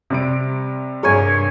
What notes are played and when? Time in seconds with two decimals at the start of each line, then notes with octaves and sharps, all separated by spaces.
0.10 C3 G3 D7
1.03 G2 G#4 A#4 C#5 G#5